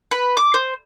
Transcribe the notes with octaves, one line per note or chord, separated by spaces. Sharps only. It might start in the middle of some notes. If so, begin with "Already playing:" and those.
B4
D6
C5